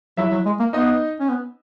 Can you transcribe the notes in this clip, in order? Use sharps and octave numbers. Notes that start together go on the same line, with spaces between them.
F#3 E4 E5
F#3
G#3
A#3
B3 D#4 D#5
C#4
B3